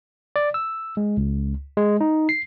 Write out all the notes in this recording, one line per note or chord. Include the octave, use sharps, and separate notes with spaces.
D5
E6
G#3
C#2
G#3
D#4
C7